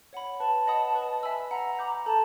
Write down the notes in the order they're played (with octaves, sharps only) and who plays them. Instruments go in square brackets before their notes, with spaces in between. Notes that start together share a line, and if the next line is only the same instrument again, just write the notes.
[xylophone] C#5 F#5 B5
[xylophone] B4 [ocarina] A5
[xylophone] D#5 F#5 B5 D#6
B4
E5 G#5 B5 E6
[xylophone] F#5 [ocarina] A#5
[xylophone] B5 D6 G6
[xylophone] A4 [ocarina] A5